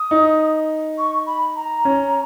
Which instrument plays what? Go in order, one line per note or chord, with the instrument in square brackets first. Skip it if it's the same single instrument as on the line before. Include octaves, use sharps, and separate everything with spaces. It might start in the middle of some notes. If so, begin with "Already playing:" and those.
Already playing: [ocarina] D#6
[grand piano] D#4
[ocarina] C#6
B5
A#5
[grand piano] C#4